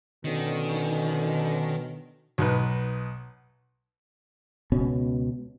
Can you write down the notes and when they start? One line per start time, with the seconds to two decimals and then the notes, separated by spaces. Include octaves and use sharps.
0.25 B2 D3 D#3 C#4
2.38 B1 D#4 B4
4.72 C#2 B2 C#4